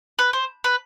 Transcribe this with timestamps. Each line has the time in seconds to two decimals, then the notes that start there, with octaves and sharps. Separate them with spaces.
0.19 B4
0.33 C5
0.64 B4